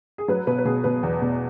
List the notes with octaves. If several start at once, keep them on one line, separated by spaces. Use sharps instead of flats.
G#4
F#3 B4
B2 B4
B4
B2 G#4
B2 B4
E2
B2